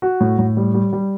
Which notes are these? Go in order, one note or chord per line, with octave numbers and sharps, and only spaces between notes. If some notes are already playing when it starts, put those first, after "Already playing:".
F#4
A2
A2
G3
G3
G3